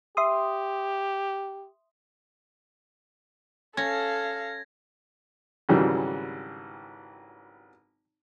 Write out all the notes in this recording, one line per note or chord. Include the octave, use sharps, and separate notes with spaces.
G4 E5 C6 D#6
C#4 A4 F5 G#6 A#6
G#1 C#3 E3 F#3 G3